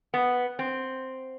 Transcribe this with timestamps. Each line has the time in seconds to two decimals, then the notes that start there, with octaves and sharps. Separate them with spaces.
0.14 B3
0.59 C4